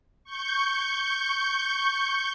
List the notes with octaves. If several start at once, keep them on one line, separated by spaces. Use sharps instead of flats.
C#6 G6